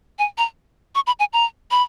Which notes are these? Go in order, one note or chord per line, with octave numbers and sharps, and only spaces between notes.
G#5
A#5
C#6
B5
G#5
A#5
B5